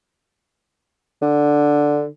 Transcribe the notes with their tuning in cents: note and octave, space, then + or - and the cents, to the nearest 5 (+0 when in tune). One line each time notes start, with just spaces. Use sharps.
D3 +0